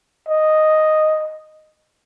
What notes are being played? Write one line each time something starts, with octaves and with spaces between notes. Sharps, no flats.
D#5